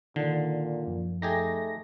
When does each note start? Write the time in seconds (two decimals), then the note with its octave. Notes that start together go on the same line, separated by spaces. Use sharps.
0.16 A#2 D3 D#3
0.87 F#2 F3
1.22 A3 D#4 G4 G#4 A#6